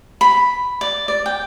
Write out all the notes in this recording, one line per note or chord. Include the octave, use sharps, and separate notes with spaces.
B5
D5
D5
G5